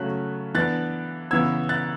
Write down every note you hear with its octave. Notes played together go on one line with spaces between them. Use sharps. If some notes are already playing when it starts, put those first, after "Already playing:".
Already playing: C#3 F#3 A3 C#4 F#6
E3 B3 D4 F#6 A6
C#3 E3 B3 E6 G#6
F#6 A6